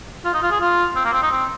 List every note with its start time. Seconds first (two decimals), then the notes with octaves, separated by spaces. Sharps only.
0.25 F4
0.33 D#4
0.42 F4
0.51 G#4
0.60 F4
0.96 C4
1.05 A#3
1.13 C4
1.22 D#4
1.31 C4